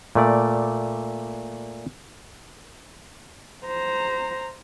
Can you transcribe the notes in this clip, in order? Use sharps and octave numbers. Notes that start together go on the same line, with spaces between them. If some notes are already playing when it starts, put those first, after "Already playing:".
A#2 A3 D5
C5 A#5